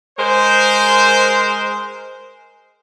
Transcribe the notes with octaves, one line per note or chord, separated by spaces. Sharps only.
G#3 A#4 C5